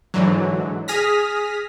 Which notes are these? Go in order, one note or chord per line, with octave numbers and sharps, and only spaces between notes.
G#2 D3 E3 F#3
G#4 D#6 F6 A#6 B6